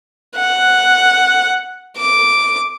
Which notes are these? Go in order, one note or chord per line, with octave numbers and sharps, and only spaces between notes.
F#5
D6